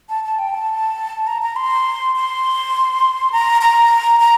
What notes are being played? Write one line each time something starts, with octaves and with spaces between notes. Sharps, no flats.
A5
A5
G5
A5
A#5
A#5
C6
C6
A#5
A#5
A#5